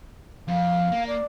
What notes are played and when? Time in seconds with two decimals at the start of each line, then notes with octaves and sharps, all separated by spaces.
0.48 F2 F5
0.92 A#3
1.08 D5